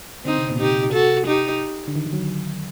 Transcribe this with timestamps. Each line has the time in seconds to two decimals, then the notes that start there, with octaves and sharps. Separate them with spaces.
0.25 D3 C4 D#4
0.38 C3
0.50 A#2
0.60 C3 D#4 G4
0.93 F#4 A4
1.27 D#4 G4
1.87 D3
1.96 D#3
2.06 D#3
2.13 F#3